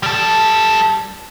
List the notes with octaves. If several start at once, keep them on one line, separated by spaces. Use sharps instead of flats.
G3 A4